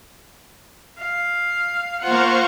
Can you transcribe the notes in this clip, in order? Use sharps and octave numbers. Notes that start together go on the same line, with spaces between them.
F5
A#3 F4 C5 F5 F#5 C#6